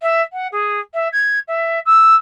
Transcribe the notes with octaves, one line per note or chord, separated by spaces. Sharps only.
E5
F#5
G#4
E5
G#6
E5
E6